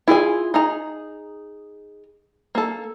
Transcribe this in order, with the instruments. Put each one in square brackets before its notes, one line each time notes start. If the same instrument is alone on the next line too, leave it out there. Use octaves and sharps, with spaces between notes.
[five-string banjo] E4 F4 G#4 G#5
D#4 G#4 A#5
A#3 A4